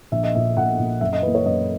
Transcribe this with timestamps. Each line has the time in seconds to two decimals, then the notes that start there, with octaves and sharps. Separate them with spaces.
0.12 A#1 E5
0.23 D#5
0.34 A#2 A#3 E5
0.57 A#1 F#5
0.79 A#2 A#3
1.01 F#2 E5
1.13 D#5
1.23 E3 A#3 B4
1.35 C#5
1.45 F#2 D#5